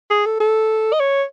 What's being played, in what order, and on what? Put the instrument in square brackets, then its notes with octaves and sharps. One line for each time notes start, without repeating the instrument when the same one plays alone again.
[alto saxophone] G#4
A4
A4
D#5
C#5